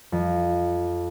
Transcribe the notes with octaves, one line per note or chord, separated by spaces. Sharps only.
F2